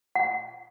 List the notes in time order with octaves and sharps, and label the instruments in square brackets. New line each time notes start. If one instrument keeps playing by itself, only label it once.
[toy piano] F#5